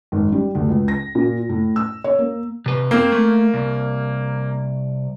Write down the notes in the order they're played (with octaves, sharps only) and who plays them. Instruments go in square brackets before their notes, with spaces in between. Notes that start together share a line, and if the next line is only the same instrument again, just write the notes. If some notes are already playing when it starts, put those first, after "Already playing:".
[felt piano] G#1
G3
D2
C#2
A#6
A#2
A2
E6
C#5
A#3
[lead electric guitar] C3 B4
[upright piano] A#3 [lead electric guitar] C4
[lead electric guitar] A3
C2